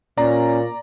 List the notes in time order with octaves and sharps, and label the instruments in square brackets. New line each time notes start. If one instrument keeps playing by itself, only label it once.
[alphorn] A#2 [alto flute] C#4 [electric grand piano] D5 A#5